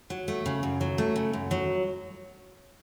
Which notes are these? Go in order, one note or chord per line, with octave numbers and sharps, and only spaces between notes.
F#3
A3
C#3
F#2
F#3
A3
C#3
F#2
F#3